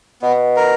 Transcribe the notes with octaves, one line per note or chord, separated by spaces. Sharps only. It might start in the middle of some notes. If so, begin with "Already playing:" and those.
B2 B3
A#4